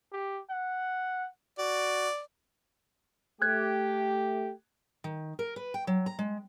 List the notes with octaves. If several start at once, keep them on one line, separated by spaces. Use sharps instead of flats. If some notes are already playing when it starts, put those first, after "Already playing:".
G4
F#5
F#4 D5
A3 G4 F#6 G#6
D#3
A#4
B4
G5
F#3
A#5
G#3